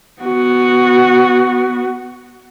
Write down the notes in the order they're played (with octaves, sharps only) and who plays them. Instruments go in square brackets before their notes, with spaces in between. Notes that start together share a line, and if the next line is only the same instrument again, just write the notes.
[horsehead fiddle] B3 F#4